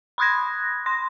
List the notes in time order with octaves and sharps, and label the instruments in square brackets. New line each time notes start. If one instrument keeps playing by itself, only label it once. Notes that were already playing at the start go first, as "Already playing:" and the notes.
[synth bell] B5 C6 D#6 F#6 G#6 A#6
C6 A#6